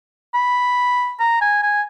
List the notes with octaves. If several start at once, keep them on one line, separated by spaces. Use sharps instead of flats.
B5
A#5
G#5
G#5